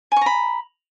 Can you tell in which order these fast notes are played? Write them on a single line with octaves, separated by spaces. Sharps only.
G#5 C#6 A#5 B5